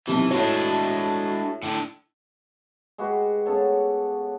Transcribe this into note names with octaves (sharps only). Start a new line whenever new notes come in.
B1 F2 C3 E3
A2 G#3 D4 F#4 C#5
A2 D3
G#3 F#4 G4 B4
C#3 B3 A4 C#5